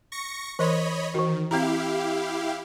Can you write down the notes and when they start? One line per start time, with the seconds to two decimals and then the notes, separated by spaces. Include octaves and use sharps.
0.12 C#6 A#6 C#7
0.59 E3 A#4 C#5 D#5 B5 C6
1.14 D#3 E3 F#4
1.51 C4 E4 G4 F5 A#5